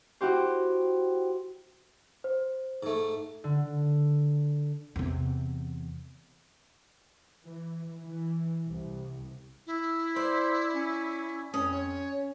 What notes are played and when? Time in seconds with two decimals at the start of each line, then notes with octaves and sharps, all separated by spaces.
0.21 E4 F#4 G4 C5
2.24 C5
2.83 G#2 A3
3.44 D3
4.96 E2 C3
7.45 E3
8.03 E3
8.68 C2
9.67 E4
10.16 C5 D5
10.75 C#4
11.54 F2 C#4 D#6
11.72 C#5